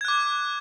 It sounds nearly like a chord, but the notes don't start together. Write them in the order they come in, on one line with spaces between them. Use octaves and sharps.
G#6 F#6 D6